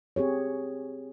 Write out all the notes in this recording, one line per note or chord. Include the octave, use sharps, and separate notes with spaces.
C4 G4 G#4 C#5